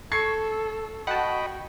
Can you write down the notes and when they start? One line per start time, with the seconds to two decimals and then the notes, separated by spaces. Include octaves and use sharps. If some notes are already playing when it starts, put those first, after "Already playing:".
0.12 A4 C#6 G#6 C7
1.07 F#4 D#5 F#5 G5 A5 B5 C#6